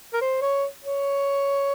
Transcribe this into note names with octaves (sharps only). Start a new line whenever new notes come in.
A#4
C5
C#5
C#5